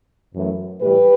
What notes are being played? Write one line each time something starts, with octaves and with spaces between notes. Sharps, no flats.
F#2 E3 A3
A2 E3 G3 G4 B4